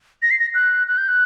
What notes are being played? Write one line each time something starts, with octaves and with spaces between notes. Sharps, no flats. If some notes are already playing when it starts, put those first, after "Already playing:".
A#6
C7
A#6
F#6
F#6
G6
F#6